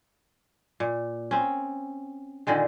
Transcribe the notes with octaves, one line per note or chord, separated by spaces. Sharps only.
A#2
C4 C#4
A#2 D3 D#3 G#3